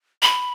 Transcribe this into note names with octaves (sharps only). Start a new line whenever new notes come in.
B5